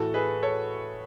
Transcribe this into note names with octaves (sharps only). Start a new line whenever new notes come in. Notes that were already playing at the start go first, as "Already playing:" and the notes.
Already playing: A2 E3 F#4 A4
G#4 B4
A4 C#5